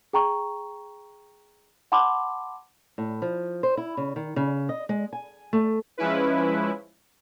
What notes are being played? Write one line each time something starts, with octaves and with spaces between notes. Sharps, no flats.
G#4 G5 A#5 C#6
F#5 A5 B5 C6 D6
A2
F3
C5
E4
C#3
D#3
C#3
D#5
G#3
G#5
A3
F3 G#3 C#4 E4 B4